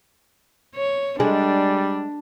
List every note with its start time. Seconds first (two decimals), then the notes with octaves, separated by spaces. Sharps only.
0.76 C#5
1.20 G3 G#3 D4